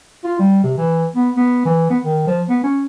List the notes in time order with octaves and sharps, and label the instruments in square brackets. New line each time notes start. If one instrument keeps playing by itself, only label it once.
[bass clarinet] F4
G3
C3
E3
B3
B3
E3
B3
D#3
F3
B3
C#4